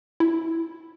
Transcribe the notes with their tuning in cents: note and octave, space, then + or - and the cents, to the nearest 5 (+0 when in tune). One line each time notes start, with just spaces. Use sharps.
E4 -5